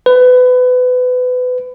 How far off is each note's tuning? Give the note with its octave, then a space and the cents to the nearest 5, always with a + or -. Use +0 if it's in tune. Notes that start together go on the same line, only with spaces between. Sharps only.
B4 +25